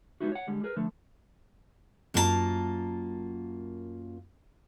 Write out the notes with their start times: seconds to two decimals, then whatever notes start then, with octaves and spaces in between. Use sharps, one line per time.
0.20 G3 G#3 B3 D#4 E4 F#4
0.32 C#5 F#5
0.47 D3 G3 G#3
0.64 G#4 A#4 B4
0.76 D3 F3 A3
2.14 F#2 A#3 F4 F#4 A5 A#5